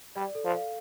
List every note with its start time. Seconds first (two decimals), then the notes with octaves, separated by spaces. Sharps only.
0.15 G3 D5
0.35 A4
0.45 F3
0.54 F5